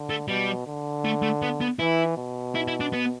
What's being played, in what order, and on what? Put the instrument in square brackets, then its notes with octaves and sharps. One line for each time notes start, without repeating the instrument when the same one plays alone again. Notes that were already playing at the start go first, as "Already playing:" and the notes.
Already playing: [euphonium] D3
[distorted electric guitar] A3
[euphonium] B2 [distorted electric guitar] G3
[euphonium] D3
[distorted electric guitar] A3
A3
B3
B3
[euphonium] E3 [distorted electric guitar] E4
[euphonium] B2
[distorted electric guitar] E4
E4
D4
B3